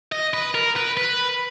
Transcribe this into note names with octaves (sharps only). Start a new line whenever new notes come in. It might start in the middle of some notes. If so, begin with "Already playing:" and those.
D#5
B4
A#4
B4
B4